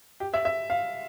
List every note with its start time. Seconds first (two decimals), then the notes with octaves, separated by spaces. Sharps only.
0.20 G4
0.34 E5
0.45 E5
0.70 F5